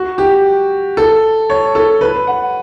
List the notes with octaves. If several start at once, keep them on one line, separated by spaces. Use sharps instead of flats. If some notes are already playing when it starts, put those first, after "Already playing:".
Already playing: F#4
G4
A4
C#5
A4
B4
F#5